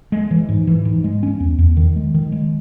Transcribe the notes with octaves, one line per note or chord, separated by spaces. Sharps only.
G#3
E3
G#2
E3
G#2
G#3
C#4
E2
E2
D#3
G#3
D#3
G#3